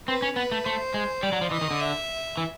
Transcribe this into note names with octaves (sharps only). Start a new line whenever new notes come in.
C4 B4
C#4
B3 B4
A3
A3 C5
G#3
G3 D5
F#3
F3
E3 D#5
D#3
D3
E5
E3